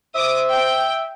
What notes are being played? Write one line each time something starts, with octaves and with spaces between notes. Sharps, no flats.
C5 E5 D6 D#6
G5